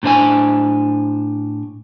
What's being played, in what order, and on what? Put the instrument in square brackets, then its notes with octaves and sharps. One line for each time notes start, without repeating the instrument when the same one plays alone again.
[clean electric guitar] A2 D4 C5 G#5